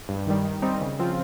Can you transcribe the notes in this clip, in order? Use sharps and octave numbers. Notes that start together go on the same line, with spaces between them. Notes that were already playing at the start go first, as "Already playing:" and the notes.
G2
D#3 G3
D#3
G3 C4 D#4
C#3
F3 C4 F4